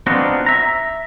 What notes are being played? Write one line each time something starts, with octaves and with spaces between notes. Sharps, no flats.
B3 C4 D4 D#4 F4 F#4
E5 A#5